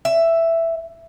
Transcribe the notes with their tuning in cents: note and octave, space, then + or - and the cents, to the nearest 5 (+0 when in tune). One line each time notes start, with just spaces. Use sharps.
E5 +5